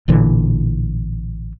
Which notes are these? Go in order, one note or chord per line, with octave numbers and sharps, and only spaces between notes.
A1 A#2 D3 E3